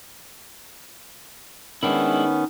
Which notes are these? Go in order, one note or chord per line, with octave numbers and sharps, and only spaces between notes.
D#3 G#3 B3 C#4 D4 E4